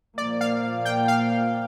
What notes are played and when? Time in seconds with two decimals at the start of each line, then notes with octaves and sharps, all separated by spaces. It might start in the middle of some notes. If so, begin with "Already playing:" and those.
0.18 A#2 F3 A#3 D5
0.41 F5
0.85 G5
1.08 F5